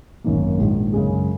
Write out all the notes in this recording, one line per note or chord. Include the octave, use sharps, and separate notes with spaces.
G#1 F#2 D#3 A#3
A#1 G#2 D#3
F#2 C#3 G#3 C#4 G#4